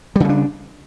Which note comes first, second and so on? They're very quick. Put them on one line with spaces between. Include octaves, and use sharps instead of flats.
G3 C#3 A3 D4